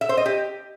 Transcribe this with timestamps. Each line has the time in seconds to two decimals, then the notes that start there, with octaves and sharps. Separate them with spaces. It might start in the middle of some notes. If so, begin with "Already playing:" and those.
0.01 E5
0.09 C5
0.17 D#5
0.26 G4